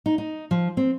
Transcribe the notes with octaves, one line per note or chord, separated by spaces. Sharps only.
D#4
D#4
F3
C4